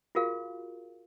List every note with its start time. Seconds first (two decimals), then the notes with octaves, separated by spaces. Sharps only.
0.15 F4 F#4 G#4 A#4 F5